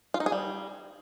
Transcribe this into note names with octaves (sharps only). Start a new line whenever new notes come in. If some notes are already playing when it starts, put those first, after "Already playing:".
F4
D#4
G#4
G3